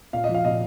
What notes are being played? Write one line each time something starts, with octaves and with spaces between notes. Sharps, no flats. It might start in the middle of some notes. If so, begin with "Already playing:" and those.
A#2 F5
D#5
F3
F5
A#2 D#5